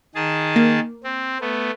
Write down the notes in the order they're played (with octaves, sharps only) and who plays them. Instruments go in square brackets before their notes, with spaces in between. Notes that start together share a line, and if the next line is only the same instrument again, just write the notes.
[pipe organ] D#3 G#4 A5
[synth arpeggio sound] A#3
[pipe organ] C4
A3 B3